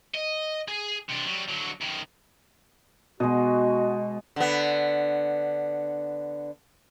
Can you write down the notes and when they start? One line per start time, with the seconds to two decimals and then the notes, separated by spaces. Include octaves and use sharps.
0.14 D#5
0.68 G#4 G#5
1.09 C3 D4
1.26 F#3 G3
1.49 D3 F#3
1.81 F#2 D#3
3.20 B2 G#3 F#4 D#5
4.36 D3 B3